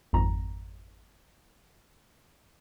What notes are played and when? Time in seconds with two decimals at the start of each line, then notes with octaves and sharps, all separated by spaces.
0.13 G#1 F2 A#5